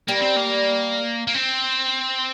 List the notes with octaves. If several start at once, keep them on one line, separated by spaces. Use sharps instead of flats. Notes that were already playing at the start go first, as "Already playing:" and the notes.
G3 A#3
C4
A#3
A#3
C4